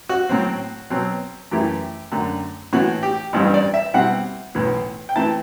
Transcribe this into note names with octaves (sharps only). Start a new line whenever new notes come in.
F#4
A2 F#3 C4
B2 F#3 C4
F#2 E3 A3 E4 G4
F#2 D3 A3
A2 E3 A3 F#4
G4
A1 G2 E3 G3 C4
D5
E5
B2 G3 C4 E4 F#5
B1 A2 E3 B3
G5
E3 A3 C4 E4 A5